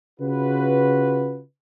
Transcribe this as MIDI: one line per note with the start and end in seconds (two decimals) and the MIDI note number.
0.20 1.41 49
0.20 1.41 65
0.20 1.41 66
0.20 1.41 71